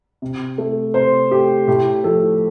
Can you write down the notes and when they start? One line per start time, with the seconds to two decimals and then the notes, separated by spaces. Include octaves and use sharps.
0.22 C3
0.58 A3
0.94 C3 C5
1.31 A3 G4
1.68 A2 G4
2.04 F3 A3 A4